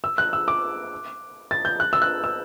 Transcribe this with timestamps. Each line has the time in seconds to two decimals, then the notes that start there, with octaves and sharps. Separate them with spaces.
0.04 E6
0.18 F#6
0.33 E6
0.48 D6
1.51 A6
1.65 G6
1.80 F#6
1.93 E6
2.02 F#6
2.24 E6